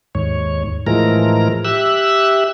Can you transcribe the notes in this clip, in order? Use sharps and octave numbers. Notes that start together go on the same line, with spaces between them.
D#2 G#2 C#5
A2 E3 F3 G#3 A#4 A#5
G4 E5 E6 F#6